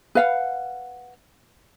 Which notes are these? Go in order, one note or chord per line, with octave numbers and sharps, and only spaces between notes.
B4 F5 F#5